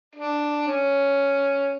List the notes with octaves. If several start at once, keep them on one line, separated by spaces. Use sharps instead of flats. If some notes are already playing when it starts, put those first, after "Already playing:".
D4
C#4